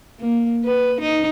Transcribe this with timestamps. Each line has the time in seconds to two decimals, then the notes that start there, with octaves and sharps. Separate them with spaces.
0.20 A#3
0.64 B4
1.01 D#4